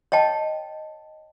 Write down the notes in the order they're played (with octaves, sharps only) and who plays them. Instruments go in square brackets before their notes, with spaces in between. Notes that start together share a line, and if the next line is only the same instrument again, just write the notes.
[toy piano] C#5 D#5 G5 A5